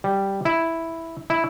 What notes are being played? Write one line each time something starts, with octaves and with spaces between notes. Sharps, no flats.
G3
E4
E4